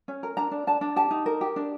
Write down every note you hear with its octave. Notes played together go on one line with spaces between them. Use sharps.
C#4
A#4
D4 A#5
D4
D4 A5
D4
G4 A5
D#4
A#4
G4
D4